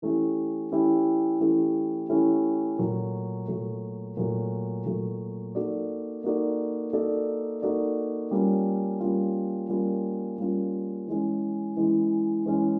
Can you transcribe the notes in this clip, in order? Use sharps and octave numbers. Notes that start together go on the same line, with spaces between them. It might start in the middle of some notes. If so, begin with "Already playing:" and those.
E3 A3 C#4 E4 G4
E3 A3 C#4 E4 G4
E3 A3 C#4 E4 G4
E3 A3 C#4 E4 G4
A#2 F#3 A3
A#2 F#3 A3
A#2 F#3 A3
A#2 F#3 A3
A#3 D#4 F#4 A4 D5
A#3 D#4 F#4 A4 D5
A#3 D#4 F#4 A4 D5
A#3 D#4 F#4 A4 D5
G3 A#3 C#4 F4
G3 A#3 C#4 F4
G3 A#3 C#4 F4
G3 A#3 C#4 F4
E3 G#3 C#4
E3 G#3 C#4
E3 G#3 C#4